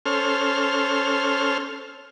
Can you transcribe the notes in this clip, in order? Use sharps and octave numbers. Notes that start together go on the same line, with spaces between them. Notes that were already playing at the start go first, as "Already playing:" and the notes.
C#4 A4 C5 F6